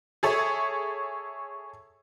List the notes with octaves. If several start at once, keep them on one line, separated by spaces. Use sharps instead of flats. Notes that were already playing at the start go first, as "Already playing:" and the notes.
G#4 A4 C#5 E5